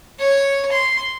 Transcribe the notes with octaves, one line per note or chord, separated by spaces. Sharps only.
C#5
C6